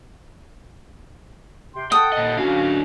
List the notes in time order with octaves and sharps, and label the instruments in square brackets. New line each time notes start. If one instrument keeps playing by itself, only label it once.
[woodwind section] C3 G5 C6
[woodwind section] A4 F#5 A5 [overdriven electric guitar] G5 [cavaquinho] D#6
[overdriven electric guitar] A#2 D#5
[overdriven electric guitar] D3 F5 [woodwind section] C#4 F#4